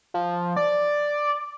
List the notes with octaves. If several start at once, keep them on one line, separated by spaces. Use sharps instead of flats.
F3
D5